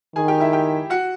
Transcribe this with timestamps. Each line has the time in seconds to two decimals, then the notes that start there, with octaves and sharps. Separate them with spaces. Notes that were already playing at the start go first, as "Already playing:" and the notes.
0.15 D#3 G#4 G#5
0.28 G4 G5
0.40 E4 E5
0.53 G4 G5
0.90 F#4 F#5